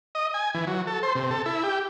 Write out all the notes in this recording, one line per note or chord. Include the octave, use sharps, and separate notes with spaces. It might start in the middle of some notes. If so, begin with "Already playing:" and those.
D#5
G#5
E3
F#3
A4
C5
C3
A4
E4
G4